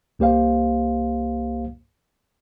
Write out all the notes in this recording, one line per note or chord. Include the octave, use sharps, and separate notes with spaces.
C2 A#3 G4 C5 F5